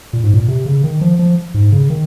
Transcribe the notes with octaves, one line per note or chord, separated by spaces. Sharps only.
A#2
G#2
A#2
C3
C#3
D#3
F3
F3
G#2
C#3
D#3